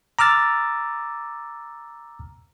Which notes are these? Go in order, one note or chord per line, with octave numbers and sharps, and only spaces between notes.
A#5 D6 E6 F6 A6